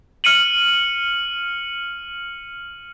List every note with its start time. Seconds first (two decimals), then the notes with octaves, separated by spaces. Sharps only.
0.24 F6 C#7 D#7 F#7